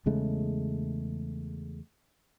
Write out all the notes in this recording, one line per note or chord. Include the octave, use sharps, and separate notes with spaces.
E2 C#3 G#3 A3